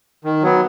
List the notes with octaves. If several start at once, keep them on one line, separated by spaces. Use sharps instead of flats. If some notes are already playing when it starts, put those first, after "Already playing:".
D#3
F#3 B3